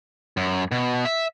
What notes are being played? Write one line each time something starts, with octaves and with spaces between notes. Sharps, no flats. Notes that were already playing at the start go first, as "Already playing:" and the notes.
F#2
B2
E5